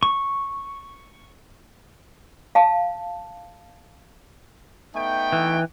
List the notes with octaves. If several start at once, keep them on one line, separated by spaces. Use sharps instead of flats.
C#6
F5 A5
A3 B3 D#4 G5
E3